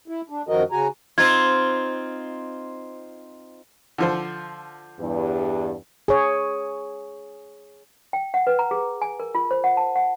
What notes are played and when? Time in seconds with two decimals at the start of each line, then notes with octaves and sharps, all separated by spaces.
0.08 E4
0.30 D4
0.49 F#2 D#3 F3 F#4 A#4 D#5
0.72 C#3 F#4 G#5 A#5
1.18 C4 D#4 F4 G#6
3.98 D3 F3 C5
4.99 E2 G2
6.08 G#4 C#5
8.13 G5
8.34 F#5
8.47 B4
8.59 A#5
8.71 G#4
9.02 G#5
9.20 A#4
9.35 F4
9.51 C5
9.64 F#5
9.77 A5
9.96 F#5